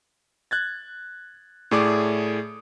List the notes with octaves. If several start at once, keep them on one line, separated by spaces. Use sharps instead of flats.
F#6 G#6 A6
A2 A3 G#4 D5 D6 D#6